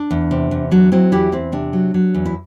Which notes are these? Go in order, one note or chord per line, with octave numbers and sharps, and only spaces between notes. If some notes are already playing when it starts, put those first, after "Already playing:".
Already playing: D4
E2
C3
E2
F#3 D4
F#3 C4 E4
E2 E4 G4
E2 C4 E4
C3 D4
F#3
F#3
E2
E4